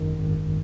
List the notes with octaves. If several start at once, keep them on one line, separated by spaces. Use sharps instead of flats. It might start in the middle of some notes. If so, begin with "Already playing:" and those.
Already playing: G#1 F#2 D#3
G#1